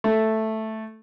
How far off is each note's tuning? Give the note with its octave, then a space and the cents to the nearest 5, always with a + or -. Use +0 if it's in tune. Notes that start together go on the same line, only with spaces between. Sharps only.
A3 +0